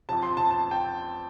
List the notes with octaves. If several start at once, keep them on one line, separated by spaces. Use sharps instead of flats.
F2 F3 A5
C6
A5
A5
G5